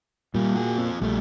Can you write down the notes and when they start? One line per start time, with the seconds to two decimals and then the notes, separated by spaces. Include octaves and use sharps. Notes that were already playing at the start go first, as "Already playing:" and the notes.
0.35 A#2 G3 A#3
0.55 F#4 G#4
0.78 C4 F4
1.02 A#1 G3 A3